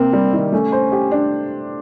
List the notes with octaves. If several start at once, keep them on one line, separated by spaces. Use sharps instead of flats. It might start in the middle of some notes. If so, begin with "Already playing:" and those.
Already playing: C3 A#3 C4
G3
D#3
A3 C#4
C5
G4
D4